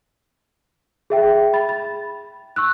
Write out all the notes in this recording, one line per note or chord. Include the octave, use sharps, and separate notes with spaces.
G#4 E5 G5
B5 A6
A6
C#6 E6 F#6